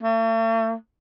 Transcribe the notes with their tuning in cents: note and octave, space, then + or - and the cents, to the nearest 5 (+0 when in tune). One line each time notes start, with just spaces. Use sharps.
A3 +45